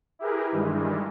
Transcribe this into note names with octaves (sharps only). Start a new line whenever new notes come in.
E4 G4 G#4 A#4 B4
G2 D#3 E3 G3 G#3